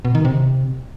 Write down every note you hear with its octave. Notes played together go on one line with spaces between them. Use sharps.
B2
D#3
C3